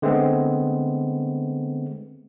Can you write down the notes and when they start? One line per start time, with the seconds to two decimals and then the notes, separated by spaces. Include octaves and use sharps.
0.02 D3 G#3 A3 B3 C4